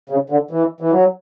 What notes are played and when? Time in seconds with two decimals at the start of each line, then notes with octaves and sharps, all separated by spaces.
0.10 C#3
0.30 D3
0.51 E3
0.80 E3
0.92 F#3